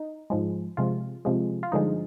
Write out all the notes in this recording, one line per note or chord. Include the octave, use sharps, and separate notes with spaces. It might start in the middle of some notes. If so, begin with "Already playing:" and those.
Already playing: D#4
G#2 F3 G#3
C3 F3 G#3 F4
C3 F3 G#3
F4
G2 D3 F3 G#3 D#4